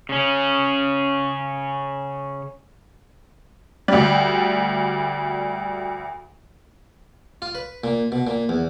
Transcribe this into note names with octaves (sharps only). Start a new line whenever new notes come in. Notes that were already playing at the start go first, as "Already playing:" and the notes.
C#3 C#4
D2 G3
F4
B4
A#2
B2
A#2
E2